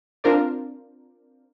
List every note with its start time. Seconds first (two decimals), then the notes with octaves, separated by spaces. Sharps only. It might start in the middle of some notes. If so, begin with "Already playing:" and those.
0.24 C4 D4 F4 A#4 C5 D5